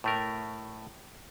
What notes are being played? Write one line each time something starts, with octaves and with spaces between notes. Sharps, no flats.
A2 A3 A#4